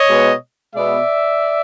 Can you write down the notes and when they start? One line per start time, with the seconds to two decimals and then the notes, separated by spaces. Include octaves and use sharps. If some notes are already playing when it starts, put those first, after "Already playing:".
Already playing: C#5 D#5
0.09 B2 G#3 B3
0.75 B2 G#3 B3 D5 E5